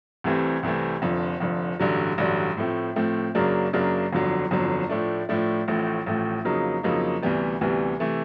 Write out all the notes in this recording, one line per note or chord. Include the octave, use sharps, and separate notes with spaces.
C2 C3 E3 A3 C4
C2 C3 E3 A3 C4
F1 F2 D3
F1 F2 D3
A1 G2 D3 F#3
A1 G2 D3 F#3
A2 F3 A3 C4
A2 F3 A3 C4
F#2 C#3 F#3 A#3 D4
F#2 C#3 F#3 A#3 D4
G1 F2 D3 F#3
G1 F2 D3 F#3
A2 F3 A3 D4
A2 F3 A3 D4
A1 A2 F3 A3
A1 A2 F3 A3
F2 C#3 F#3 A#3 D#4
F2 C#3 F#3 A#3 D#4
D2 C3 E3 G3 B3
D2 C3 E3 G3 B3
C3 E3 A3